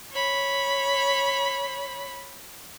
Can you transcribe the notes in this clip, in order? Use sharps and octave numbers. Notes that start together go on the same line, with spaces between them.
C#5 B5